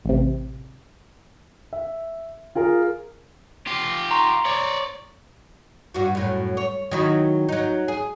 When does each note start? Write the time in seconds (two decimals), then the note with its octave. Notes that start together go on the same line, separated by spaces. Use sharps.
0.05 A1 C3
1.73 E5
2.55 F4 G#4 A#4
3.67 F4 G4
4.11 A#5 C6 C#6
4.45 C#5 D5
5.94 G2 F#4
6.15 F#2 A2
6.57 C#5
6.91 D#3 F#3 E4
7.49 F#3 D#4
7.88 G#4